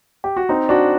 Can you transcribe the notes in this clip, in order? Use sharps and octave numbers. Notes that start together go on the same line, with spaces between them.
G4
F#4
C4 D#4
D4 F#4